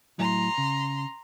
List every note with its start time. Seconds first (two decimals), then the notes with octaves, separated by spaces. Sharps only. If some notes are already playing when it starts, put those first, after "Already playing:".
0.18 A2 F#3 E4 A#5 C6
0.58 C#3